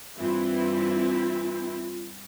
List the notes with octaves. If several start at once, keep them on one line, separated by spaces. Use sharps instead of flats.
G2 E3 C4 E4 F4